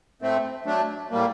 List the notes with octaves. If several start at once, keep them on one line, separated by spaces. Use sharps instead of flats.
A2 A3 C4
F#3 A3 D4
A2 G3 A#3